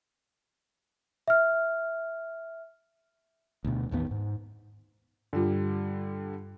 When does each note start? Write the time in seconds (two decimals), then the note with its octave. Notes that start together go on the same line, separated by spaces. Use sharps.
1.28 E5 F6
3.65 D2 B2
3.91 A1 D#2 D#3 B3
4.11 G#2
5.33 G2 D3 G3 F4